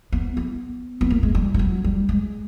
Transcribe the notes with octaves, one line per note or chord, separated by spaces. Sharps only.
B3
B3
B3
A#3
G#3
G3
F3
F#3
G3
G#3